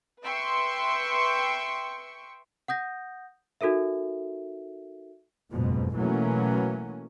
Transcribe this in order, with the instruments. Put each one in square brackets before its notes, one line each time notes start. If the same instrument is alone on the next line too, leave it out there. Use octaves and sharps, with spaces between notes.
[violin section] B4 E5 G5 C6 C#6 C#7
[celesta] F#5 D#6 G6 A#6
D#4 F#4 A4 A#4 E5
[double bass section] F#1 F2 G#2 B2
B2 E3 F#3 A3 A#3 C#4